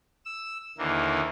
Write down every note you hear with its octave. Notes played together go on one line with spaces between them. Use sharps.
E6
D#2 D3 E3 A#3